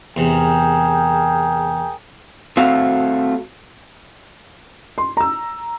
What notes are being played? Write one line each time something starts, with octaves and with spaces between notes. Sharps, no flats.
E2 C3 G#4 A#4 G5
A3 C4 F#4 F5
C6
A#5 E6